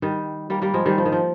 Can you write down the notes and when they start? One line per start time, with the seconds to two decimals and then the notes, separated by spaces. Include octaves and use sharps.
0.02 D#3 G3
0.50 G3 A#3
0.62 G3 A#3
0.74 F3 G#3
0.86 D#3 G3
0.98 F3
1.05 D#3
1.12 F3